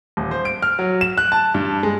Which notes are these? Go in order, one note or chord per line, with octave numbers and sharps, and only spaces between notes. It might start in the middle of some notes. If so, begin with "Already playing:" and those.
D#1
C5
D7
F6
F#3
E7
F#6
A5
G2
G#3